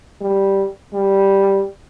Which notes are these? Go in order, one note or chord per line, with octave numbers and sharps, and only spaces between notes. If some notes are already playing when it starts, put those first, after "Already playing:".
G3
G3